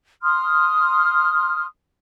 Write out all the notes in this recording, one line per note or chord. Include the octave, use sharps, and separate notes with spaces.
C6 D#6 F6